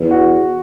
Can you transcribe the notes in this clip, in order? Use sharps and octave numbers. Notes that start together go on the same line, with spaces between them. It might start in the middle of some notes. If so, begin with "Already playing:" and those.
Already playing: E2
F#4